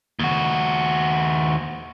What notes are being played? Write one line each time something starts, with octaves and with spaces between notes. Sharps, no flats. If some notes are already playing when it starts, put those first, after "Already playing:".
D#2 F#4